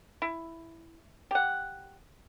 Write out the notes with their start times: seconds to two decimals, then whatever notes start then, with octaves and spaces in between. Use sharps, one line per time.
0.22 E4
1.31 G4 F#5